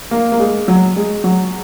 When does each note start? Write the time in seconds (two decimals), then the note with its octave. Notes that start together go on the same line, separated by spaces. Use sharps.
0.11 A#3
0.32 A#3
0.39 G#3
0.68 F#3
0.96 G#3
1.24 F#3